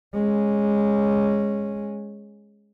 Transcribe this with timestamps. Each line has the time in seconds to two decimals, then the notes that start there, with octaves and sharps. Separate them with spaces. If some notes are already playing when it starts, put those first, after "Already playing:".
0.14 G#3 C#4